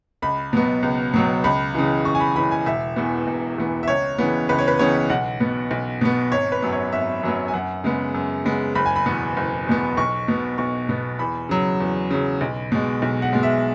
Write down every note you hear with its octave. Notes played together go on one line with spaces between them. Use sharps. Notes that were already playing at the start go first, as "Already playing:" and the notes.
C#2 B5
B2 F#3 B3
C#2
B2 F#3 B3
C#2 B5
C#3 E3
C#2 C#6
G#5
B5
C#3 E3 B5
G#5
E1 E5
E2 E3 B3
E1
E2 E3 B3
E5
C#2 C#5
C#3 E3 B3
C#2 B4
C#5
B4
C#3 E3 B3 C#5
B1 F#5
B2 B3
B1
B2 B3
G#1 C#5
B4
F#2 F#3 B3
C#5
G#1 E5
F#2 F#3 B3
G#5
F#2 F#5
C#3 G#3 B3
F#2
C#3 G#3 B3
F#1 B5
G#5
B5
E2 B2 B3
F#1
E2 B2 B3
B1 C#6
B2 B3
B1 C#6
B2 B3
E2 B5
C#3 F#3
E2
C#3 F#3
B1
B2 G#3
B1
F#5
B2 G#3
E5